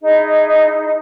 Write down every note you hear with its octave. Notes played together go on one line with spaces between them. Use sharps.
D#4 E4 G#4 D#5